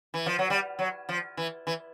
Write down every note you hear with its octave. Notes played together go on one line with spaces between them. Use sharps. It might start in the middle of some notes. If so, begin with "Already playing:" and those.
E3
F3
F#3
G3
F#3
F3
E3
E3